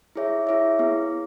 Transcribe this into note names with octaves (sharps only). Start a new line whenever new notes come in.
E4 G#4 C#5 E5
E4 G#4 C#5 E5
B3 E4 G#4